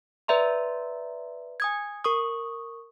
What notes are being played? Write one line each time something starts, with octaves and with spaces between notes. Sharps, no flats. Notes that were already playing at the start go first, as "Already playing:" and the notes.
B4 D5 E5 A#5 C6
G#5 D#6 G#6
A#4 C#6 D#6